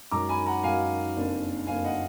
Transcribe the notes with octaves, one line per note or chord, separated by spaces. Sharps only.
F#2 D#3 G#3 A#5 D6
G#5 B5
F#5 A#5
F#2 D#3 G#3 F5 G#5
F#1 F2 D#3 A#3 D4
F#1 F2 D#3 A#3 D4 F5 G#5
D#5 F#5